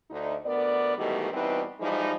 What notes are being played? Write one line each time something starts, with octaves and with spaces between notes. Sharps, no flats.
D2 D#4
D2 B3 A#4 D5
G#2 B2 D#3 E3 G3 A3
B2 E3 G3 C4 D#4 B4
E3 F3 G3 G#3 D#4